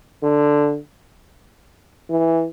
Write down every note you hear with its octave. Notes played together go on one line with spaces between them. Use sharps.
D3
E3